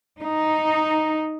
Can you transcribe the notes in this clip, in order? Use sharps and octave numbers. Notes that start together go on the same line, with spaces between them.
D#4